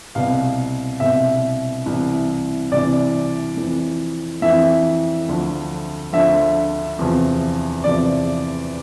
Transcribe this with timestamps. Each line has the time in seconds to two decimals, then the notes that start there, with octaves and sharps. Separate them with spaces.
0.15 C2 B2 F5
1.00 C2 B2 E5
1.86 C2 C3 E3
2.71 C2 C3 E3 D5
3.57 F2 E3
4.42 F2 E3 E5
5.28 D2 D3 F3
6.13 D2 D3 F3 E5
6.99 E2 C3 F3
7.84 E2 C3 F3 D5